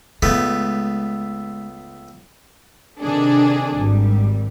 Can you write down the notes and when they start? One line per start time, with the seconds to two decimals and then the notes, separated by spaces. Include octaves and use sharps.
0.22 C#2 G#3 A3 B3
3.00 C3 D#3 D4 G#4 A4
3.75 G#1 G3